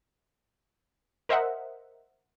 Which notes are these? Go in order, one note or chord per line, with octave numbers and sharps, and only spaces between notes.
A#4 C5 D#5 E5 F#5